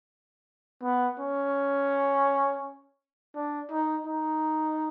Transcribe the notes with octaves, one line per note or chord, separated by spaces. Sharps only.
B3
C#4
D4
D#4
D#4